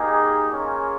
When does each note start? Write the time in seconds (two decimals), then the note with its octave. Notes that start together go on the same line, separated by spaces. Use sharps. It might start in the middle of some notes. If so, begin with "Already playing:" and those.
Already playing: A#3 D#4 G4 G#4
0.50 A#3 C#4 F4 G#4